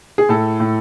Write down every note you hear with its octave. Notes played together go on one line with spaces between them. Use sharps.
G#4
A2 A4
A2